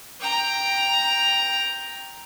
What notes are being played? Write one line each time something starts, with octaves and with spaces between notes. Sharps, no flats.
G5 A#5